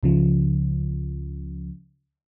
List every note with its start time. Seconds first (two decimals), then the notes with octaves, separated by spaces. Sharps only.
0.03 C#2 C#3 F3